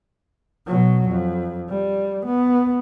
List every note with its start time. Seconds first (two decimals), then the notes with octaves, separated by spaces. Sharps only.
0.66 B2 F#3
1.09 F2
1.69 G3
2.26 B3